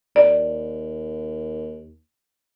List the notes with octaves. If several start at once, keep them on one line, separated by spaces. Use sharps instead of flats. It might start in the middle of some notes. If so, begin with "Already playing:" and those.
D#2 D5